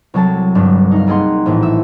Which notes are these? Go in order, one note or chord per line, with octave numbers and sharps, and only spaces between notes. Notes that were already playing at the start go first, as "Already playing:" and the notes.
C2 F#3 A4 A5
G1 G2 D4
D#4 F5
G3 A#3 G#4 D#5 F#5 C6
A#1 A2 E3 A3
E5 E6